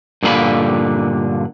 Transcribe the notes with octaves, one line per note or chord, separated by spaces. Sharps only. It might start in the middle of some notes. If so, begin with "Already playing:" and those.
G2 A#2 D3 A4 F5 B5